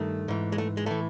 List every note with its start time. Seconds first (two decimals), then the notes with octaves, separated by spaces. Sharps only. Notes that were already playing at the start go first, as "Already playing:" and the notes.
Already playing: G2 D#3 A3
0.28 G#2 E3
0.52 G#3
0.58 A3
0.77 G#3
0.86 A2 E3 A3